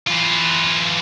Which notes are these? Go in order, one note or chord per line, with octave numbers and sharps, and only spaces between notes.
E3 F4